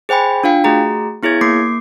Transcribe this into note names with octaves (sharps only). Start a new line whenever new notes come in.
G#4 C5 G5 G#5 B5
D4 F4 F5 G5
A3 F#4 G#4 A#5
B3 E4 G#4 C#5 G#6
A#3 D6 C7